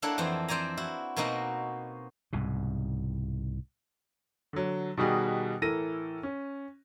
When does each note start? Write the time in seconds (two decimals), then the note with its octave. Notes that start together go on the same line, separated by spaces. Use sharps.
0.02 A#3 D4 E4 A4 C#5 F#5
0.18 F2 E3 C4 C5
0.48 C4 C5 D5 G#5 A#5
0.77 E4 F#4
1.16 B2 A#3 C4 D#4 F#4
2.33 C2 G#2 B2
4.53 D3 F#3
4.97 B2 D#3 G3 D#4 F#4 G#4
5.62 A2 E3 A4 A#4 A#6 D#7
6.23 C#4